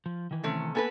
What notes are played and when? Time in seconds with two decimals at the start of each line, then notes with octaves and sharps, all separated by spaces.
0.06 F3
0.31 D#3 E3
0.44 C3 A3 C#4
0.75 A#3 B3 A4 B4 G#5